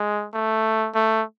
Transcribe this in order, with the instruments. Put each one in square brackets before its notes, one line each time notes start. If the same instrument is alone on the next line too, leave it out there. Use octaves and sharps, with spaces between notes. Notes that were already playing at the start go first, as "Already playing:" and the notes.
Already playing: [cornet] G#3
A3
A3